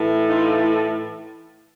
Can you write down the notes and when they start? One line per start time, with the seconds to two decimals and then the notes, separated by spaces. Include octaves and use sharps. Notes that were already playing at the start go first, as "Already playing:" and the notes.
Already playing: A2 E3
0.29 D#4 F4